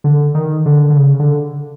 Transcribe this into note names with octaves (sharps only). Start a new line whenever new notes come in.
D3
D#3
D3
D3
C#3
D3